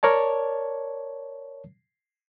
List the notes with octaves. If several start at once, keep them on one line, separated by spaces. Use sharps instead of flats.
A#4 C#5 D5 A5